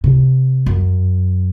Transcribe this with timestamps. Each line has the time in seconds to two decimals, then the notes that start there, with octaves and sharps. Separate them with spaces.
0.04 C3
0.66 F#2